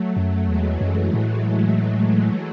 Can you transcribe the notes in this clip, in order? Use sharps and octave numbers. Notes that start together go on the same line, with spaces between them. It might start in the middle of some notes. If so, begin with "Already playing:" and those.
Already playing: F#3 A3
F#2
E2 E3 G#3
F#2
A2